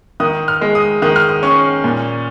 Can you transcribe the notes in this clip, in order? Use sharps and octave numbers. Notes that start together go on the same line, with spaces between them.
D#3 D#6
F6
G#3
D#6
D#3 D#6
F6
D#6
C#4 C#6
A#2